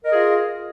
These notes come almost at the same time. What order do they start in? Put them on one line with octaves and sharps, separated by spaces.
A#4 D#5 G#4 F4